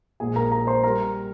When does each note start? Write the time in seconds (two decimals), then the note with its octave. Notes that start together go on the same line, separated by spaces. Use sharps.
0.20 A#1 A#2 G#3 G#4 G#5
0.36 A#4 A#5
0.51 A#4 A#5
0.67 C5 C6
0.83 G3 A#4 A#5